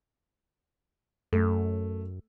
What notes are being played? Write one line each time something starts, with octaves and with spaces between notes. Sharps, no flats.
F#2 A3